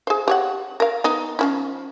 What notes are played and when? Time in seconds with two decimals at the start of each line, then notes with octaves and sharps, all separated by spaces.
0.07 G#4 C5
0.28 G4 C#5 F#5
0.80 A#4 F5
1.04 B3 D#4
1.39 F3 C#4 E4